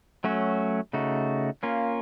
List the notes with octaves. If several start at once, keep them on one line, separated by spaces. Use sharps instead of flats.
F#3 A3 C#4 F#4
C#3 A3 D#4 F#4
A#3 C#4 F4